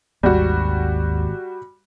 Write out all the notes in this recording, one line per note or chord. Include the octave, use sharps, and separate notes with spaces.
G#1 D#2 G3 F#4